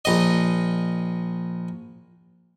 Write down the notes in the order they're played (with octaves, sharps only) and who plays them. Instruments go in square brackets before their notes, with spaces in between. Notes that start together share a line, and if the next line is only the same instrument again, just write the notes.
[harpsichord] A#1 D#5